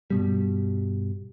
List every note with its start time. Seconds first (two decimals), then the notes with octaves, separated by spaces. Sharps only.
0.10 G2 B2 G3